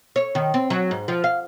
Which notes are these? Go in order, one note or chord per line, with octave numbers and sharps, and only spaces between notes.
C#5
D#3
C4
F#3
G#2
F3
F5